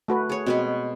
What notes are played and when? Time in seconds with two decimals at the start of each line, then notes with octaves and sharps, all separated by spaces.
0.08 A3 F#4 B4
0.29 G#4 C#5
0.46 B2 G#3 C4 B4